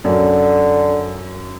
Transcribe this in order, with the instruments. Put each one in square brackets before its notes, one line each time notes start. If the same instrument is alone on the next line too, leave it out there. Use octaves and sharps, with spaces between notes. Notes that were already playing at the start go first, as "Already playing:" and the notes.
[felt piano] F#2 [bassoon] D3